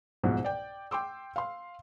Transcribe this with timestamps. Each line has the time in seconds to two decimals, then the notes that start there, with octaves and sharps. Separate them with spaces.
0.23 C2 G#2 B2 F3
0.44 D5 G5
0.91 G5 C6 D6 E6
1.36 F5 C6